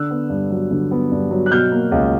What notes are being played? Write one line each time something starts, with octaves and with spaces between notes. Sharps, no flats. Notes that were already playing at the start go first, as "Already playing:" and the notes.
Already playing: D3 E6 F#6
B3
G2
F#3
D3
B3
G2
F#3
F#6
B2 F6 G6
A#3
C#2